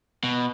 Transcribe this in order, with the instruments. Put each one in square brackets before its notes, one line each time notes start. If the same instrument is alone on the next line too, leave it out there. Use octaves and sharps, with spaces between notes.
[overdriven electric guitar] B2